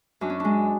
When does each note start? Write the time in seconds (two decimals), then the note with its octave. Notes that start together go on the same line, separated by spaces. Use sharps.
0.21 F#2 D4
0.30 C#4
0.40 G#3 D4